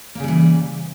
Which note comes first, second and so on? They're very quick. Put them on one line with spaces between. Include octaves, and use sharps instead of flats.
A#3 C#3 G3 E3